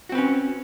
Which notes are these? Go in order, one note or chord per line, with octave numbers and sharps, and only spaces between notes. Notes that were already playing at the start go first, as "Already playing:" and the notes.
C4 C#4 F#4 B4